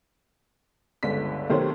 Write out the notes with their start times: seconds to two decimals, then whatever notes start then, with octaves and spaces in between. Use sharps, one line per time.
1.03 G1 C#2 D3 B6
1.50 B1 C3 D#3 A3 C5 C#5